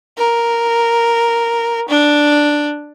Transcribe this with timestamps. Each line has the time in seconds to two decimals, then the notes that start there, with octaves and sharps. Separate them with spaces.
0.17 A#4
1.88 D4